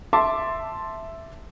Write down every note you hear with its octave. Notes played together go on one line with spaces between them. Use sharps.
E5 A5 C6 D6